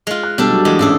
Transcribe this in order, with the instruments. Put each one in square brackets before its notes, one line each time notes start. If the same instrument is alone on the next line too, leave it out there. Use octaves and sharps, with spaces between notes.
[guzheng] G#3 F4
[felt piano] F#6
[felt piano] B2 [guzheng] G3 D4 A4
[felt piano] F#3 F#4
[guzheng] E2 G#3 G4
[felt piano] A1 [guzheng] G#4 A4 D5